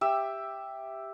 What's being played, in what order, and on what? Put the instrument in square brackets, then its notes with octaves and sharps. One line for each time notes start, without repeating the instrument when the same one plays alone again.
[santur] G4 E5 G5 E6